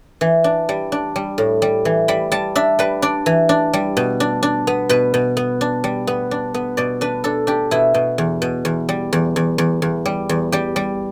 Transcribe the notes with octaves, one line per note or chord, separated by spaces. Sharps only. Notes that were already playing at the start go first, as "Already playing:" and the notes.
E3
D4
G3
D4
G3
A2
G3
E3
G3 B5
G3 A5
D4 E5
G3 B4
D4 D5
E3
D4
G3
B2
D4
D4
B3
B2 B4
B2
B3
D4
G3
B3
D4
B3
B2 D5
D4 B4
D4 A4
D4 G4
B2 E4
B2
E2
B2
E2
G3
E2
E2
E2
E2
G3
E2
G3 G4
G3